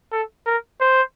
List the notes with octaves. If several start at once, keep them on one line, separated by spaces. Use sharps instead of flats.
A4
A#4
C5